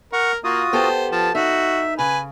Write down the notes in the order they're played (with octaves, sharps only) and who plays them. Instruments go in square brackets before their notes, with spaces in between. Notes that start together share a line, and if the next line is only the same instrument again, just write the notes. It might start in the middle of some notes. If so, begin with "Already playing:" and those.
[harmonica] A#4 [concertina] F#5 C#6
[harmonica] A#3 [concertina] F4 F#4 D#6
[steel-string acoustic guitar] B3 G4 A4 [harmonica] C5
[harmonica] F3 [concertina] A5
[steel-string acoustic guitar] D#4 [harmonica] F#4 [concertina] E5
[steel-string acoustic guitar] C#3 [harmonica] B4 G#5